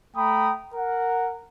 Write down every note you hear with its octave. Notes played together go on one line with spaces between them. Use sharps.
A3 G5 A#5 B5 D#6
A#4 F#5